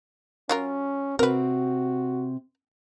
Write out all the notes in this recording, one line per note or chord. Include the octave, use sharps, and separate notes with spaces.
F#3 C#4 F4 A#4
C3 C4 F#4 A#4 B4